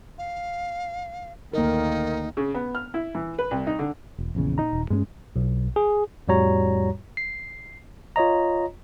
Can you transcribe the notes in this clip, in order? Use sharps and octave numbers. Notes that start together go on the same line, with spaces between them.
F5
D2 D#3 A#3 D#4 A#4
C#3
B3
F6
E4
E3
B4
C2
D#4
D3
E1
A#1 E2 C#3
A#2 D#4 A#5
D#1
G2 G#3 A#3 C#4
B1
G#4
F2 A2 G3 F#4 C#5 A#5
C7
F4 C#5 D#5 A#5